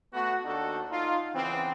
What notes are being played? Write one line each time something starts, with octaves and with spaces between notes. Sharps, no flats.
A3 B3 F#4
D#2 D4 D#4 F#4 A4
D#4 F4
C#3 E3 B3 C4